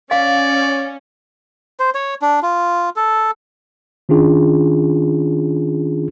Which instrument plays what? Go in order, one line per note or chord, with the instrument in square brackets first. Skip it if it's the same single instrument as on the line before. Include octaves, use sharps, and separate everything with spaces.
[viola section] C#4 [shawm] D5 [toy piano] F5
[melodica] C5
C#5
D4
F4
A4
[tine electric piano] D#3 C#4 D4 F4 G#4